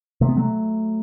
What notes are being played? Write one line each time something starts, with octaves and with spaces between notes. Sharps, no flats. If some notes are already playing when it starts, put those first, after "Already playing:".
C3 A3
B3
F#3 A3